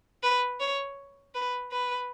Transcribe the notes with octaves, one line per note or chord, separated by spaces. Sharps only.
B4
C#5
B4
B4